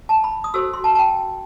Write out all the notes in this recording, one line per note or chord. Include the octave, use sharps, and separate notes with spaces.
A5
B5
D#6
F#4 A4 C5 E6
C6
A5
A5
G5